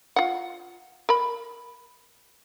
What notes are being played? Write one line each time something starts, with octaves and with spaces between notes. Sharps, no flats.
F4 F#5
A#4 B5